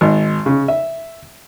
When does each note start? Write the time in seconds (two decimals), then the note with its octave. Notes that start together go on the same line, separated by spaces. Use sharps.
0.01 G#1
0.46 C#3
0.68 E5